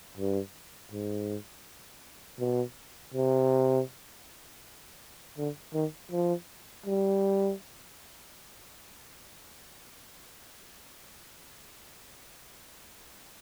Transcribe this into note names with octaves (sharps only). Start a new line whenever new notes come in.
G2
G#2
B2
C3
D3
D#3
F3
G3